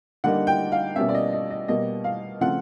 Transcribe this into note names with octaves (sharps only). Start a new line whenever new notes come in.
D3 G3 A#3 D#4 F#5
G5
F5
B2 G3 A#3 C#4 E5
D5
D#5
D#5
D#5
B2 G3 A#3 D#5
F5
C#3 F3 A3 C4 F4 F#5